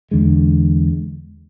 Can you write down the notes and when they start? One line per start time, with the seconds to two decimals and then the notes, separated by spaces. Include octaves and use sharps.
0.11 E2 D3 G#3